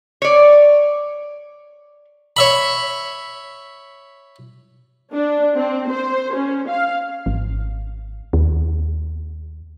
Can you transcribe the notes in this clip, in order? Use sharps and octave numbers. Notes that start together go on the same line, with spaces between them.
C#5 D5
C#5 E5 B5
D4
C4
C5
C#4
F5
G#1
D#2